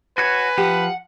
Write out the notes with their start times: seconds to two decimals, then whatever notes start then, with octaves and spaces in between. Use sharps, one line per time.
0.18 F#4 B4 C#5 G#5
0.58 F3 G4 F#5